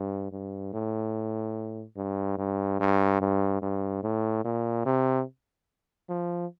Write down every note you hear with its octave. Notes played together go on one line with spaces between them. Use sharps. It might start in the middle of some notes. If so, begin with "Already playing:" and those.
Already playing: G2
G2
A2
G2
G2
G2
G2
G2
A2
A#2
C3
F3